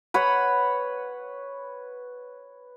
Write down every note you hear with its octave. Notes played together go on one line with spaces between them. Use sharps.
B4 C#5 F#5 B5